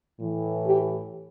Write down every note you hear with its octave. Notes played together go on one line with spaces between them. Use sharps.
A2 E3
G4